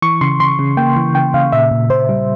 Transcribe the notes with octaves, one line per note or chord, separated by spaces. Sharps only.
E3 C#6
C#3 C6
C#3 C6
C#3
A#3 G5
E3
C#3 G5
C#3 F5
A#2 E5
A#2
A#2 C5
G3